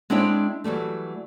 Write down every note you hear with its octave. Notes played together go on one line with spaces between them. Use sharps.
G#3 C4 D4 E4 C#5 G5
E3 F#3 G3 A3